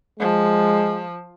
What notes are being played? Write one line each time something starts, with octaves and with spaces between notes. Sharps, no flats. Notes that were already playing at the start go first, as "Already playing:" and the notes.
F3 G#3